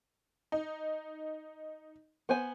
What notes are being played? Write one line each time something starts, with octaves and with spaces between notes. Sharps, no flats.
D#4
B3 C5 G#5